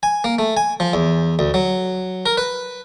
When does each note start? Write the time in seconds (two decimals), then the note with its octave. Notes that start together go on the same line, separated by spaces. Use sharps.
0.03 G#5
0.24 A#3
0.39 A3
0.57 G#5
0.80 F3
0.93 E2
1.39 D2
1.54 F#3
2.26 A#4
2.37 B4